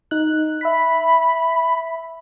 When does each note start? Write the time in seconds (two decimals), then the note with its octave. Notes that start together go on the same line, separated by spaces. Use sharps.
0.11 D#4 F#6
0.61 E5 B5 B6